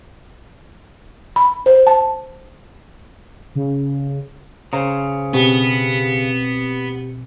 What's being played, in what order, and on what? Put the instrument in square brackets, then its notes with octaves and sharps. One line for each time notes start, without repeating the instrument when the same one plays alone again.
[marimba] B5
C5
A5
[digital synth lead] C#3
[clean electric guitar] C#3 [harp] C5 A#5
[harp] B2 [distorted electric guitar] B3 [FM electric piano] C4 G4 C#7